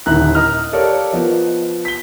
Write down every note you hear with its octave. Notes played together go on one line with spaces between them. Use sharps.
D#1 D3 D#3 E4 A#5 F#6
D#5 A#5 D#6 F6
G4 A4 A#4 C#5 D5 F5
F3 B3 D#5
B6 G7